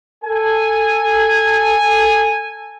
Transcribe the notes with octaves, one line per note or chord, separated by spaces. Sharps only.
A4 G#5